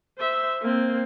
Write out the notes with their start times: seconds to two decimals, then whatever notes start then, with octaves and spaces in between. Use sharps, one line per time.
0.18 C5 E5
0.62 A#3 C4